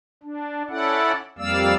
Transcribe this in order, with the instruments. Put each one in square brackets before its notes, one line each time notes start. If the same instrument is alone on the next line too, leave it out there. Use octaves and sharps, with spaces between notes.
[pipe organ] D4
C#4 E4 A4 D5 F#5
F2 G3 A#3 D5 F5 E6